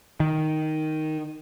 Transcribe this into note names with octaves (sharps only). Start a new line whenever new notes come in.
D#3